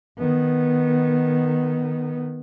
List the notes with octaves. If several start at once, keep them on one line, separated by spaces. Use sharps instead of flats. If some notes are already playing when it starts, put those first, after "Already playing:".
D#3 B3